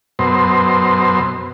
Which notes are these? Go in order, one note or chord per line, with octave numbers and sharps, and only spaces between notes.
F#2 B2 C5